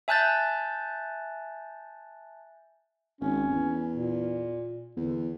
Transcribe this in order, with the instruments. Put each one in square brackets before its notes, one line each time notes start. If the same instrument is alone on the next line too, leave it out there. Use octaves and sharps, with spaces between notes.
[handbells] E5 G#5 A5 F#6 G6 A6
[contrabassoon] G#1 [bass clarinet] C#4
[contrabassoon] E2
[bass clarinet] A#2
[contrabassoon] E2 [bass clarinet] D3